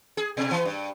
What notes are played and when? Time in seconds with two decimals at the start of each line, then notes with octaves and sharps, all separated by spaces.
0.17 G#4
0.37 B2
0.51 E3
0.65 G2